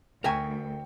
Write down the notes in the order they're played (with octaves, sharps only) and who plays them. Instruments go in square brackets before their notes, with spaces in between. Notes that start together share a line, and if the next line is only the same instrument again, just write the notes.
[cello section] D2 [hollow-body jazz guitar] A#4 E5 G#5 [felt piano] G5 C#6